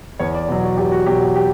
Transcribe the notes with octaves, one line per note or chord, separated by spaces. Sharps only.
E2 C#5
D5
B2 F#3
F#4
E2 G4
F#4
B2 F#3 G4
F#4
G4